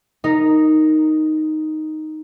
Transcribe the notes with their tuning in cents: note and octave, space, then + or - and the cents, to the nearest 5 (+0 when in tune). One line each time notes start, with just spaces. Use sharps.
D#4 +0 A#4 -10